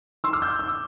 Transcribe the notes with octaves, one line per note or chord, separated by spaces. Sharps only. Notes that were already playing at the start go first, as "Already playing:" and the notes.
C6 E6
D6 F6
E6 G6
E6
D6